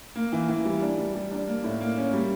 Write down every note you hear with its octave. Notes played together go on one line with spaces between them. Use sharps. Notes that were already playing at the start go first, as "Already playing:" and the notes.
A#3
E3
E3
G3
D4
G3
G3
D4
A#3
A2
A#3
C#4
G3